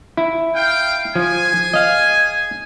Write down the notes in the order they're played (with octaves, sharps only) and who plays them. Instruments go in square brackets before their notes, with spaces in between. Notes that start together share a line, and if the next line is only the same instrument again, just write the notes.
[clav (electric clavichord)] E4
[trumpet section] F5 G5
[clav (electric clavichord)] F3 [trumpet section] G#4 G#5
[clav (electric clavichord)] D#5 F5